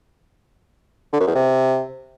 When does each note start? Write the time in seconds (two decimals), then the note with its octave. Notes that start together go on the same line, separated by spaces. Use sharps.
1.13 D3
1.20 F#2
1.27 E2
1.35 C3